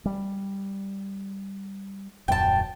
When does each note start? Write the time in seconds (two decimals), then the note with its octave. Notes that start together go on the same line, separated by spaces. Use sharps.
0.05 G3
2.28 D#1 F#2 G5 A5